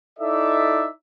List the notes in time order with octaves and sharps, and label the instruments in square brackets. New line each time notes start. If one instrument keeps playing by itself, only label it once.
[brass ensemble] D#4 E4 A4 D5 E5